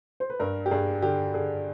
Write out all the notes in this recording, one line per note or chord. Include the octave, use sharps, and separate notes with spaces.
C5
B4
G2 A#4
G4
G2 G#4
D3 G4
D3 G#4